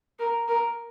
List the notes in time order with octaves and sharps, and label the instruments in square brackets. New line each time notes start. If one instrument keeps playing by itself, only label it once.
[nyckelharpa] A#4
A#4